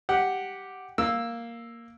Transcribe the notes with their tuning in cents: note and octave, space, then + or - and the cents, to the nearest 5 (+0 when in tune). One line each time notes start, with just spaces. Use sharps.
G4 -5 F#5 +0
A#3 +0 E6 +0